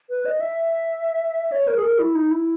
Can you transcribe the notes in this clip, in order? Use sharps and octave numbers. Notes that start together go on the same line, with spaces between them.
B4
D#5
E5
C#5
A#4
G#4
A#4
E4
D#4
E4